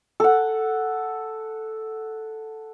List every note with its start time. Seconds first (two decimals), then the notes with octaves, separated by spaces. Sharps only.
0.20 A4 F#5